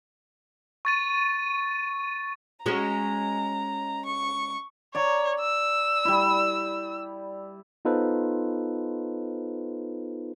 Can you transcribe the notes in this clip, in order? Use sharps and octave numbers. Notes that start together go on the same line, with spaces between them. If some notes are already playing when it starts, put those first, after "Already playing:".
C#6 A6 D#7
G#3 C#4 F#4 A#5
C#6
C#5 D5 A#5
E6
G3 E4
B3 D#4 F4 A4 B4 C5